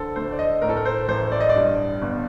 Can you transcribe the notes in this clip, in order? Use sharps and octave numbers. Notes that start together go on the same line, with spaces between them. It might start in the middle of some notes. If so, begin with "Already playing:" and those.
Already playing: D3 A4 C5
D2 C5
D5
D#5
A2 A#4
A4
A#4
C5
A1 C5
D5
D#5
D5
G2
G1